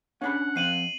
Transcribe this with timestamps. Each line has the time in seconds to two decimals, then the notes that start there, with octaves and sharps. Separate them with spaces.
0.21 C#4 D4 F#5 B5
0.56 F2 C4 F5 C7 D#7 F#7